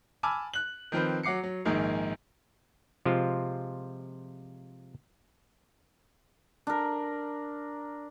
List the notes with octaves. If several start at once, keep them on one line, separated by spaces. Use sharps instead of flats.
G#5 A5 B5 D6 E6 F6
F#6 F#7
D#3 F3 C4 B4
F#3 F#5 D6 C7 C#7
F#3
A#1 G#2 D#3 G#3 A#3
C3 F3 G#3 F4
D4 A#4